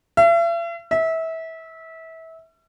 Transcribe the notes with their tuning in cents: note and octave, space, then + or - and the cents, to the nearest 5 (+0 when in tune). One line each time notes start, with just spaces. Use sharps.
E5 +45
E5 -25